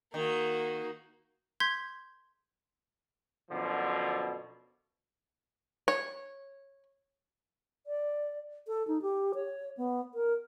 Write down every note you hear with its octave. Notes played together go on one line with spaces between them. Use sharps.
D#3 A#3 F#4
C6 G6 G#6 B6
F#2 B2 D3 F3
C#5
D5
A4
D#4
G4
C#5
B3
A#4